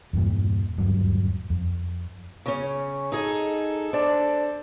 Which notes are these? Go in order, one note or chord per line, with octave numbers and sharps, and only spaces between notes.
E2 G2 A#2
D#1 D2 G2 F#3
F2
C#3 C#4
D#4 G#4 A4
D4 C5 D5 A5